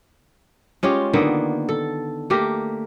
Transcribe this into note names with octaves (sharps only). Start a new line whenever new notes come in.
G#3 C#4 F4 G4
D3 D#3 A#3 B3
A4
A3 A#3 G4 A#4